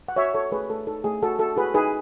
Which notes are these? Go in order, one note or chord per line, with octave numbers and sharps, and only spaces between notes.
F#5
F#4 C#5 E5
F#4 A4 C#5
A3 G#4 B4
A3 A4
D#4 A4
A3 G#4
F#4 A4
F#4 A4
F#4 G#4 B4
D#4 G#4 B4